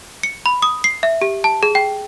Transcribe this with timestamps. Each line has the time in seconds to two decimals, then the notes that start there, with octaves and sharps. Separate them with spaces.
0.23 C#7
0.46 B5
0.62 D#6
0.84 C7
1.03 E5
1.22 G4
1.44 A5
1.63 G#4
1.75 G5